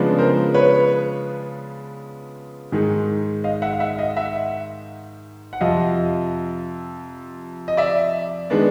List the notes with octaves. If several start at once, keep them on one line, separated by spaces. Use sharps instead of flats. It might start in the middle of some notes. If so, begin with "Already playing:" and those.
Already playing: C#3 F3 G#3 B3 D4
A#4 C5
B4 C#5
G#2 D#3 G#3
D#5 F5
E5 F#5
F5
E5 F#5
D#5 F5
E5 F#5
F#5
F2 C3 F3 D#5 F5
D#5
D5 E5
D#3 G#3 B3 D4